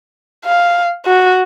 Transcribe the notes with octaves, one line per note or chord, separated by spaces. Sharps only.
F5
F#4